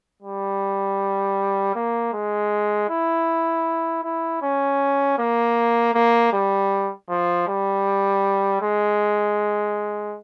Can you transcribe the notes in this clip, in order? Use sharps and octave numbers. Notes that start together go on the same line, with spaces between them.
G3
A#3
G#3
E4
E4
C#4
A#3
A#3
G3
F3
G3
G#3